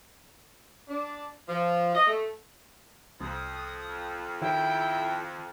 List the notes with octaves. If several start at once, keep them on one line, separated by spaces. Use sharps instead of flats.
D4
F3
D#5
A3
C2 F2 D#6
D#3 E4 G5